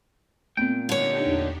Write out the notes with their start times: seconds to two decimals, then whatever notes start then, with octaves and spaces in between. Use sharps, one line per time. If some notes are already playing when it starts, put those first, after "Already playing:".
0.57 A#2 A3 B3 C4 G5
0.89 D3 D4 D#4 G4 C#5
1.26 E2